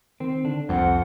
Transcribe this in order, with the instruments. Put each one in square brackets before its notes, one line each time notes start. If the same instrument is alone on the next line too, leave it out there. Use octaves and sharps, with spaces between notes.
[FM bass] D#3 [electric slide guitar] C4
[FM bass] D3 [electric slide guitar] D4
[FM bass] C2 [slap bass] F2 [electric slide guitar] C4 [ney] F#5